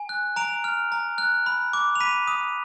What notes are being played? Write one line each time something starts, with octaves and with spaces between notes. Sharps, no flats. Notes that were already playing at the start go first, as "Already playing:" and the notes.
Already playing: G#5
F#6
A#5 D7 F7
F6
A#5
F#6
B5
D6
F7
B5 B6 D#7
D#6